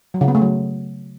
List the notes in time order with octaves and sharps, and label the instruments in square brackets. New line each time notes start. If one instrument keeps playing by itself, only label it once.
[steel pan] F#3
C#3
B3
A3
F#3